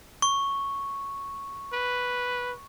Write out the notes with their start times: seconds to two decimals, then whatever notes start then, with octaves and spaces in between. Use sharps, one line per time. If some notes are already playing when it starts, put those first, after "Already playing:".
0.22 C#6
1.73 B4